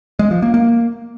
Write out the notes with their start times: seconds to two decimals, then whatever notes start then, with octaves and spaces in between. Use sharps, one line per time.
0.19 G#3
0.31 F3
0.42 A#3
0.54 A#3